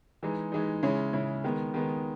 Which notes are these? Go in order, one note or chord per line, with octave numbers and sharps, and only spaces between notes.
E3 G#3 D#4
E3 G#3 D#4
C#3 G#3 C#4 E4
C#3 G#3 C#4 E4
D#3 G#3 B3
D#3 G#3 B3